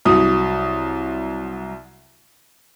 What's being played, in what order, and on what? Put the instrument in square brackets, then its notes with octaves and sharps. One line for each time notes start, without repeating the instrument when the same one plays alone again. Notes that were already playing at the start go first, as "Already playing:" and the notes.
[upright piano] C2 F#3 D#6